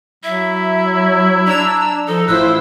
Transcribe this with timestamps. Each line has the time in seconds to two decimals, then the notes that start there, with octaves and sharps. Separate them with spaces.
0.24 F#3 E4 E5
1.47 D4 A#5 E6
2.08 F3 D#4 A4
2.28 A1 E4 F4 B4 C5 E6